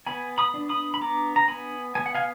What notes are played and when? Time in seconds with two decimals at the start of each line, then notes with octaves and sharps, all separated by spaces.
0.07 B3 G#5 B5
0.38 B5 D#6
0.54 D4
0.69 B5 D#6
0.94 B5
1.01 B3 A#5 D6
1.36 A#5
1.48 B3 G#5 B5
1.95 B3 G#5
2.06 F#5
2.15 F5 G#5